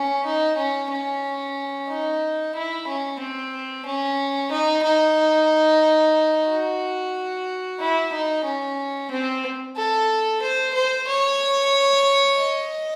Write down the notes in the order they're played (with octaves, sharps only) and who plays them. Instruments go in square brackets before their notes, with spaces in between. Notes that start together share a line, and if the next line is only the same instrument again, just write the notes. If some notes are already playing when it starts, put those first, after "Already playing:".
Already playing: [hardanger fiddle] C#4
D#4
C#4
C#4
D#4
E4
C#4
C4
C#4
D#4
D#4
F#4
E4
D#4
C#4
C4
A4
C5
C5
C#5
D#5